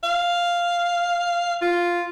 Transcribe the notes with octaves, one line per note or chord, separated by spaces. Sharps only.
F5
F4